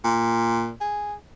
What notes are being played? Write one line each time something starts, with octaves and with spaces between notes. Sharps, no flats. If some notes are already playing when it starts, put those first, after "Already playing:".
A#2
G#4